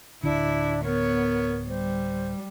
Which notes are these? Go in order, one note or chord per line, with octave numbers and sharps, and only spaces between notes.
D1 G1 D3 D4 E4
B3 A#4 C#5
G3 C5